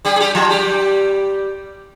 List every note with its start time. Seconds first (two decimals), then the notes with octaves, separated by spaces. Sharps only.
0.05 G3 G4
0.16 G#4
0.20 G3 G4
0.35 F3 F4
0.49 G3 G4